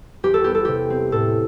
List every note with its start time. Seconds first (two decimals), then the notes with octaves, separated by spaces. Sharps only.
0.23 E2 G4
0.34 A4
0.44 B3 G4
0.55 A4
0.65 C3 G4
0.90 C4
1.12 A2 A4